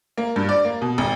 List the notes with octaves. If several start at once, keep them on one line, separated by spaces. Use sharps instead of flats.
A#3
G2
D5
A#3
B2
G#1